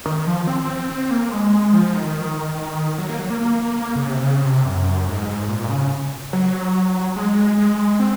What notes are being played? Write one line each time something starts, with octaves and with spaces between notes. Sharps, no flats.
D#3
F3
C4
C4
A#3
G#3
F3
D#3
F#3
A#3
F#3
A#3
A#3
A#3
C#3
C3
C#3
C3
F#2
G#2
A#2
C#3
F#3
G#3
G#3
C4